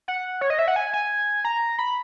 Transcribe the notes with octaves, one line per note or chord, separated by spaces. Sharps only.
F#5
C#5
D#5
E5
F#5
G#5
G#5
A#5
B5